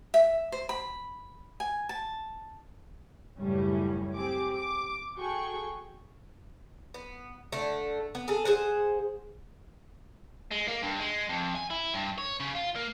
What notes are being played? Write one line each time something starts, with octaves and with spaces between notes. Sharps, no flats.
E5
C5
B5
G#5
A5
C#2 F#2 A2 G3 C#4
C4 G4 G#4 D6
D6
F#4 G#4 A4 G5 C#6
B3
D3 A3
B3
G#4 A4
G#4 C5 F#5
G#3
A#3
G2
G#3
F2
G#5
E4
G2
C#5
C#3
F4
A#3